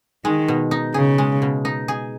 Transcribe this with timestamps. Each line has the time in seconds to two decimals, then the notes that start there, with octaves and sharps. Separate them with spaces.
0.25 D#3 G#3
0.48 B2
0.71 D#4
0.94 C#3 G#4
1.18 G#3
1.42 B2
1.65 D#4
1.88 G#4